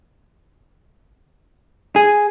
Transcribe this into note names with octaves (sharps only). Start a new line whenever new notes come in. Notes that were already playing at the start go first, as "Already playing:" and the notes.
G#4